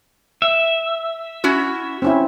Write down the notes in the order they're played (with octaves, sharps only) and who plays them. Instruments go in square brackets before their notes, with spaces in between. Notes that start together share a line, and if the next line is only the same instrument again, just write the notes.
[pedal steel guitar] E5
[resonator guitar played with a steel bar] C#4 E4 F#4
[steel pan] C4 C#4 E4